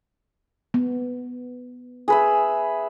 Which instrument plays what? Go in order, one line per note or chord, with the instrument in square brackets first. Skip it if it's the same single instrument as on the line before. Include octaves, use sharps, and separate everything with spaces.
[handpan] B3
[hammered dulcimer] G#4 B4 E5